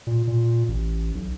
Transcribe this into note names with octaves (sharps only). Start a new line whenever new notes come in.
A#2
A#2
A1
B1